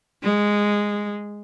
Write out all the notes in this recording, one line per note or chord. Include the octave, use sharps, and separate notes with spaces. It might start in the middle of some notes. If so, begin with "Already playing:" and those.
G#3